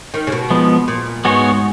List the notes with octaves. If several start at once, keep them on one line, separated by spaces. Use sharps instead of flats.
D#3
C#3
B2
F3 G#3 B3
A#2
G#2 G#3 B3 F#4 C#5